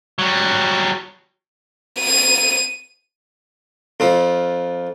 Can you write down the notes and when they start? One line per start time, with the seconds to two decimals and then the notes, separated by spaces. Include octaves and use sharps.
0.19 F#3 G3
2.01 D#7
4.00 F2 F3